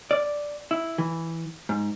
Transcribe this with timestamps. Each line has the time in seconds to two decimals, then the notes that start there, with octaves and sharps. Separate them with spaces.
0.11 D5
0.71 E4
0.98 E3
1.69 G#2